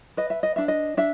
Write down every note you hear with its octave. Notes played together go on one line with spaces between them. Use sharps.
B4 D#5
E5
D#5
D4 E5
D#5
D4 E5